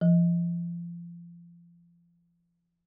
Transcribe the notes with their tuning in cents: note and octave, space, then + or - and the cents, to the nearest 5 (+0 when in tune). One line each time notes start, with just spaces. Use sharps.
F3 -30